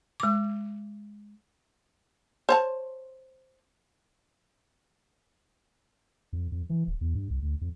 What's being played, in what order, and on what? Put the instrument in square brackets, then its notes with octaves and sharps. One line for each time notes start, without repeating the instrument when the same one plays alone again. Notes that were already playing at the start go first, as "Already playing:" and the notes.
[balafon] G#3 D6
[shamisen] C5 C#5 A5
[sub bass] F2
F2
E3
D#1
E2
G2
C2
D2
F2